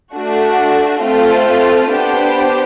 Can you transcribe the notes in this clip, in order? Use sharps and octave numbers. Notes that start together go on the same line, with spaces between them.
A3 D4 F#4
A3 C4 F4 A4 C5
B3 D4 G4 C5